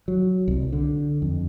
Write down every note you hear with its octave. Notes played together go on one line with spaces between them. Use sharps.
F#3
C2
D3
F2